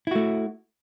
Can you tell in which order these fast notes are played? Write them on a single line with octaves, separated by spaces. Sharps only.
E4 F#4 A3